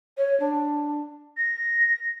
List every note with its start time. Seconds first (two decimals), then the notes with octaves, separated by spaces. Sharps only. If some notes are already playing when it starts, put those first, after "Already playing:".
0.18 C#5
0.40 D4
1.37 A#6